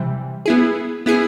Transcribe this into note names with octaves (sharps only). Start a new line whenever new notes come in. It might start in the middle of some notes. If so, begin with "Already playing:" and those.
Already playing: C3 E3 G3
B3 E4 G#4
B3 E4 G#4